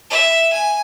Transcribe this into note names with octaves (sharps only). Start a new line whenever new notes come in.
E5
G#5